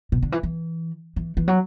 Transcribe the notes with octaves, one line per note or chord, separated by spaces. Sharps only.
B2
D3
E3
E3
E3
E3
F#3